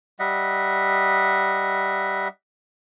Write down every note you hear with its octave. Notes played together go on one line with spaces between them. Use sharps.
G3 D#5 E5 F#5